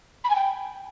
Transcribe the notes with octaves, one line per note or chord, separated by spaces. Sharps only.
B5
G#5
G5